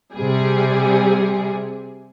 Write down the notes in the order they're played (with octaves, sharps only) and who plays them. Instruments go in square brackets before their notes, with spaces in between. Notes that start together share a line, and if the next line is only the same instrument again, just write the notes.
[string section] C3 G3 G#4